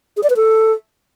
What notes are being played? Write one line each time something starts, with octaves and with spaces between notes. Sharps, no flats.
G#4
D5
B4
A4